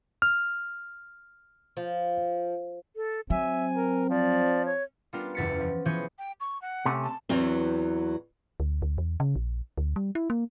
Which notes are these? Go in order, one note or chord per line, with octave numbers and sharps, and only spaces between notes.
F6
F3
A4
F#3 C4 E5 G#5
A#4
F3 D5
C#5
G3 B3 D4 F4 A#4
F#1 E2 A6 B6 C#7
F3
E3 F3 B3 G#4 C#5 G6
G5
C#6
F#5
C3 A3 C#4
A5
E2 E3 F#3 C4
D2
D2
E2
C#3
A#1
D2
G3
E4
A#3